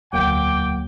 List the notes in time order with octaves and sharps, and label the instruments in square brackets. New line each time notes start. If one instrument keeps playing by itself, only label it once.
[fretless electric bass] E1 D2 [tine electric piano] F#3 A#3 F#5 [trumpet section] G5 [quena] D6